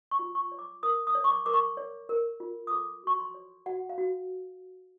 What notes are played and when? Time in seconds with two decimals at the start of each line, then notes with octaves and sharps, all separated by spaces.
0.11 C#6
0.19 F4
0.35 C#6
0.52 C#5
0.59 D6
0.83 A#4 D#6
1.07 D#6
1.15 C#5
1.24 C#6
1.29 D6
1.46 A#4 D6
1.54 C#6
1.77 C#5
2.09 A#4
2.40 F4
2.67 D#6
2.71 A4 D6
3.03 F#4 C#6
3.19 C6
3.34 C#5
3.66 F#4 F#5
3.89 F5
3.98 F#4